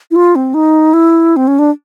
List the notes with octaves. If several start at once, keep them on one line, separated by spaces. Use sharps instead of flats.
E4
F4
C4
D#4
E4
C4
C#4
D4